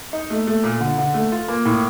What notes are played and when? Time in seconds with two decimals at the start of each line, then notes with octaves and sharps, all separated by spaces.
0.13 D#4
0.30 A3
0.47 A3
0.64 A#2
0.81 D3
0.98 D3
1.14 A3
1.32 F4
1.48 A#3
1.66 A2